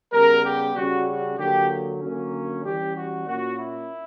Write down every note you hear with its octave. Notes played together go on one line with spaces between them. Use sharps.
C#3 G3 B3 A#4
G4
C#3 G3 C#4 F#4
F#4
D3 F#3 A#3 G4
D3 F#3 A#3 C#4
E3 G3 C#4 G4
F#4
A#2 A#3 C#4 F#4
E4